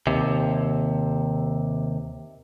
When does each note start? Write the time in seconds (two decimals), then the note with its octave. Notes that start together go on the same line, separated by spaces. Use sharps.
0.07 D#2 C3